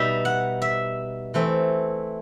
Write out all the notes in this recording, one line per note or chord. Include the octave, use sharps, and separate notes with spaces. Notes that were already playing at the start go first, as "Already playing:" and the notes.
Already playing: B2 G3 D#4 E5
F#5
E5
E3 A3 C4